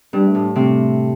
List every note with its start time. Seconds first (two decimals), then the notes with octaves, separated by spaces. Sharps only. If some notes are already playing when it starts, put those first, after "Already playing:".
0.13 G2 G3
0.27 A3
0.35 A2
0.56 C3 A3